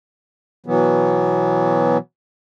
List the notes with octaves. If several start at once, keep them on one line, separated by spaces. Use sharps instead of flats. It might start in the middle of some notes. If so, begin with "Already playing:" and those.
B2 E3 F#3 B3